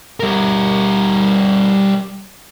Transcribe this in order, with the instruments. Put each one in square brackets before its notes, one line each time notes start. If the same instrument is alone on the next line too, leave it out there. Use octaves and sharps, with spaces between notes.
[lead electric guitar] G3 A#4